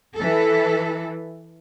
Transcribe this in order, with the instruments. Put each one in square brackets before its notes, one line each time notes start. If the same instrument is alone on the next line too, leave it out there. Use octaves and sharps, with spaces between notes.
[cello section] E3 A4